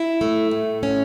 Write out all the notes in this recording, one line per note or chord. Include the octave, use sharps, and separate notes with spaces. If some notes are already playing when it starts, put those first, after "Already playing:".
Already playing: E4
A3
A2
C#4